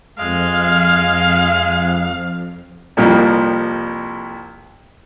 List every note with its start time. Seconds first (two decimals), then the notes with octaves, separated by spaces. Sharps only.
0.19 F2 G#3 F5
2.97 C2 F2 A#2 F3 G3